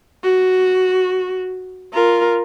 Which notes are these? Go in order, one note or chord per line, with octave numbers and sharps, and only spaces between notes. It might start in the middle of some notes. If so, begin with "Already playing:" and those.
F#4
F4 A#4